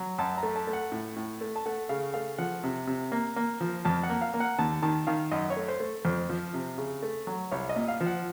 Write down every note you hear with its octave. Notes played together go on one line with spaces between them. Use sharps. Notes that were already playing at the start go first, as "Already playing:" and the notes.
Already playing: F#3
F#2 A5
A#5
A3
A5
A3
F#5
A2
A2
A3
A5
A3 F#5
C#3 F5
A3 F5
F3 F#5
C3
C3
A#3
A#3
F3
F2 A5
F#5
A#3
F5
A#3
F#5
D#2 A5
D#3 A5
D#3 F5
F#2 D#5
C#5
A3
C5
A3
F2 C5
F3
C3
C#3
A3
F#3
C2 C#5
D#5
A#2
F5
F3
F#5